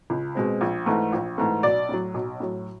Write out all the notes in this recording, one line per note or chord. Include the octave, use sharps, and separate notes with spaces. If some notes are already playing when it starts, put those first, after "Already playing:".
C#2
B2 G#3 C4
A#1
G#2 E3 A3
A#1
G#2 E3 A3
B1 D5
A2 F#3
B1
A2 F#3